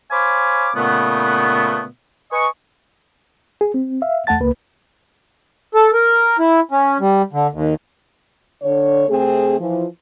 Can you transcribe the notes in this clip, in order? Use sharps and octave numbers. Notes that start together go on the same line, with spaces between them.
C5 C#5 F5 G#5 B5 D6
A#2 C#3 A3 B3
B4 D#5 G#5 C#6
G#4
C4
E5 F5
E2 A3 F#5 A5 A6
C#2 A#3 B4
A4
A#4
E4
C#4
G3
D3
D#2
D3 C#5
C3 A3 C4 G#4
E3 F3